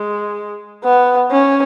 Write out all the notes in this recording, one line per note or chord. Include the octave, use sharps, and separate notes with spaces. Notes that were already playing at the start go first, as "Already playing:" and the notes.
Already playing: G#3
B3
C#4